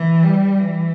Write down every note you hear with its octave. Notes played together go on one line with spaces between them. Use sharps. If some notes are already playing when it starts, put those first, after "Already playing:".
Already playing: E3
G3
E3